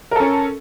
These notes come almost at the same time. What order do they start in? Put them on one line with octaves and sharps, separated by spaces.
A#4 A4 C#4